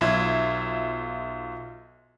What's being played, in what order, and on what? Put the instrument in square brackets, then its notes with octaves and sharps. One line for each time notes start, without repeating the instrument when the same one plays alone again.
[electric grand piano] B1 F4 E5 G#6